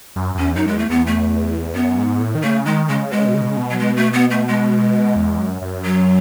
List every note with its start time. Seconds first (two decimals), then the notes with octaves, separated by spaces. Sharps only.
0.16 F#2
0.35 F#2
0.38 E2 C#4
0.56 F#2 D#4
0.67 G#3
0.73 E2
0.79 A3
0.90 E2 B3
1.07 A3
1.75 F#2 B3
1.98 G#2
2.20 A2
2.35 D#3
2.43 C#3 A3
2.66 D#3 G#3
2.89 C#3 G#3
3.11 B2 G#3
3.19 C#3
3.26 B2
3.34 C#3
3.42 B2
3.49 C#3
3.57 B2
3.71 F#3
3.79 G#3
3.97 A3
4.13 B3
4.31 A3
4.48 G#3
5.16 E2
5.38 F#2
5.62 F#2
5.84 F#3